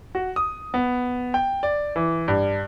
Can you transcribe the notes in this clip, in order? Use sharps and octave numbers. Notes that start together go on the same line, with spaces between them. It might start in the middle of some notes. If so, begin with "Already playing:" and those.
F#4
D#6
B3
G5
D5
E3
G2